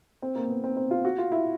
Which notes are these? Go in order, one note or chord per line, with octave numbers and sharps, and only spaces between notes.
C4
A#3
B3
C4
C4
F4
F#4
F4
E4